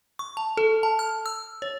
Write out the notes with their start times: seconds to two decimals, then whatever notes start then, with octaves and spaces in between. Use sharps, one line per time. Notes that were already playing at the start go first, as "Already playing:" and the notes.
0.19 C#6
0.37 A5
0.57 A4
0.83 A5
0.99 F6
1.26 E6
1.62 C#5